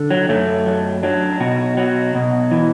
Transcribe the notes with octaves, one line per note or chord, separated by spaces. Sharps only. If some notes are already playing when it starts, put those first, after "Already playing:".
Already playing: D3
F#3
F#2 A3
F#3
F#3 D4
B2 F#4
F#3 F#4
B2
E3